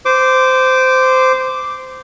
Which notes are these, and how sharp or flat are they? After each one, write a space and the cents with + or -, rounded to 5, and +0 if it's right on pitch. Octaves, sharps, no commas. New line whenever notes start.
C5 -15 D6 +0